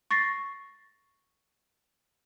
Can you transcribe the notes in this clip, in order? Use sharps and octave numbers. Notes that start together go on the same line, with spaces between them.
C#6 A6 A#6 C7